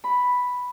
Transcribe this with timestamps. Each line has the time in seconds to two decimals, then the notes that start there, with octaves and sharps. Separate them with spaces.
0.04 B5